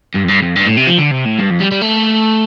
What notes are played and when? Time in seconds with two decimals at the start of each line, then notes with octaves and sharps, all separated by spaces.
0.14 G2
0.23 F2
0.28 G2
0.42 F2
0.56 G2
0.66 A2
0.77 C3
0.87 F3
0.98 D3
1.11 C3
1.26 A2
1.39 G2
1.51 F2
1.60 G3
1.71 G3
1.81 A3